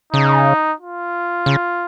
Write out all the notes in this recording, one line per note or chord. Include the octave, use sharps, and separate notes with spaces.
C#3 D#4
F4
C#3